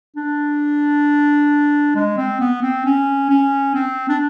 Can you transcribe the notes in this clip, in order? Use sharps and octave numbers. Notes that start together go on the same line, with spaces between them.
D4
G#3
C4
B3
C4
C#4
C#4
C4
D4